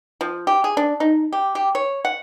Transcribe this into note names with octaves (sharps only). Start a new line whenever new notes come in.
F3
G4
G#4
D4
D#4
G4
G4
C#5
F#5